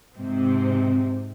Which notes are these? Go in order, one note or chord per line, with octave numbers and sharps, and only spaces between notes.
G#2 C3 C4